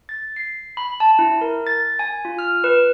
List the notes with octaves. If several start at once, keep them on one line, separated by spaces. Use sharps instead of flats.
A6
C7
B5
A5
E4
A#4
A6
G#5
F4
F6
B4